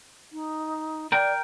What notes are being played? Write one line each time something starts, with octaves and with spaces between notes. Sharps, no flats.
D#4
A#4 D5 G5